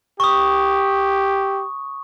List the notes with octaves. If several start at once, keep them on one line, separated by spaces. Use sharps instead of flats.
G4 C#6 D#6